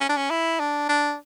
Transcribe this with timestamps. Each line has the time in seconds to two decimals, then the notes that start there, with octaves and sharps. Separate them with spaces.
0.01 C#4
0.09 D4
0.17 C#4
0.30 E4
0.60 D4
0.89 D4